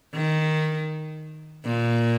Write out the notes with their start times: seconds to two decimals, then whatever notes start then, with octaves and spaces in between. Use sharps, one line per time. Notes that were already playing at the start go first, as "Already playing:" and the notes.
0.14 D#3
1.65 A#2